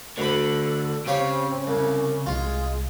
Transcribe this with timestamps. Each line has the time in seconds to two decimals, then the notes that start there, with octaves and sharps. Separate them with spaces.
0.18 D2 D3 A4 B5
1.07 C#3 C4 G4 C#5 F5
1.67 C2 C#4
2.26 C2 G#3 F4